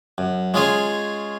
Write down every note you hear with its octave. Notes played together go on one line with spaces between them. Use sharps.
F#2
G#3 C#4 F4 G#4 C#5 G#5